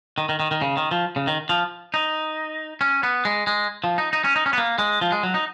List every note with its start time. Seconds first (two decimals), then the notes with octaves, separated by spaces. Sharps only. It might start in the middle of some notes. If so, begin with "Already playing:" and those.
0.18 D#3
0.29 D#3
0.40 D#3
0.51 D#3
0.62 C#3
0.77 D#3
0.91 F3
1.16 C#3
1.27 D#3
1.49 F3
1.94 D#4
2.81 C#4
3.03 B3
3.25 G#3
3.47 G#3
3.84 F3
3.98 D#4
4.13 D#4
4.24 C#4
4.36 D#4
4.46 C#4
4.53 B3
4.58 A#3
4.78 G#3
5.01 F3
5.12 G#3
5.23 F#3
5.34 D#4